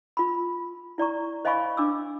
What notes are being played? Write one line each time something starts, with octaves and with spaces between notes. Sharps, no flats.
F4 B5
E4 D5 A#5 C#6
C5 D#5 F5 G#5 B5 C#6
D4 D6 E6